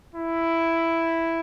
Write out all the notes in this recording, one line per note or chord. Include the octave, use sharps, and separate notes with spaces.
E4